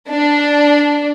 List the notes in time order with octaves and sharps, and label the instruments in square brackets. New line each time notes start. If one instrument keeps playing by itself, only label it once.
[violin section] D4